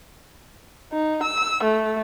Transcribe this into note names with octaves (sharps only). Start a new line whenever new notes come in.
D#4
E6
A3